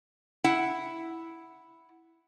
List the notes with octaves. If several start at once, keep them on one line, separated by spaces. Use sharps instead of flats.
E4 F#5